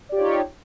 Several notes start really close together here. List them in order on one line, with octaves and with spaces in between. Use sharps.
D5 G4 F4 C#5 D#4